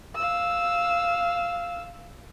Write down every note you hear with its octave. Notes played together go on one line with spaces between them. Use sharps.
F5 E6